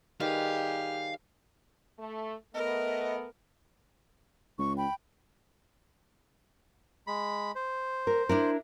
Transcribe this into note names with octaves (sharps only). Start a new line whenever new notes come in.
D#3 G3 G4 G#4 B4 F5
A3
A3 B3 A#4 D#5
C#2 C#6
G5 B5
G#3 B5
C5
A#4
D4 E4 A#4